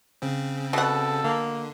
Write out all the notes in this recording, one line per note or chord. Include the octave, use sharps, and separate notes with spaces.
C#3 C4
B2 A4 F#5
D3 A#3